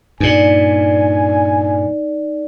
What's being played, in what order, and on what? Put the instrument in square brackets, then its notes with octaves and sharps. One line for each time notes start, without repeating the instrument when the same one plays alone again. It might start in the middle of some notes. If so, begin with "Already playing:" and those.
[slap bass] G2 A#2 [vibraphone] D#4 D5 [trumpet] G#5